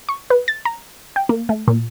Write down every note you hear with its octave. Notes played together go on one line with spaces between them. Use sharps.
C#6
B4
A6
A#5
G5
A#3
A3
A#2